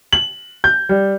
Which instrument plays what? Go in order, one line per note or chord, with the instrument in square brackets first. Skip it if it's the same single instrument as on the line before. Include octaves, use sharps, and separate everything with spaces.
[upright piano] F#7
G6
G3